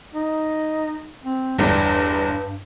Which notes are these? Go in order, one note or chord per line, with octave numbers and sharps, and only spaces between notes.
D#4
C4
G1 E2 G2 D4